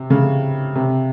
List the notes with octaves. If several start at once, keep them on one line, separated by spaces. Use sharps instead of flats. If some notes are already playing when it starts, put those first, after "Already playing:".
Already playing: C3
C#3
C3